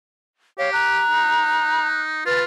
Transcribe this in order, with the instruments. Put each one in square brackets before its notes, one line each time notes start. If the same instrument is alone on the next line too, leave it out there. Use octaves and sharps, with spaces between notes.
[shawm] G4 [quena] C#5 [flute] F5
[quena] A#5 [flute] F#6
[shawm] D#4
[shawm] F4 [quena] B4 [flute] A6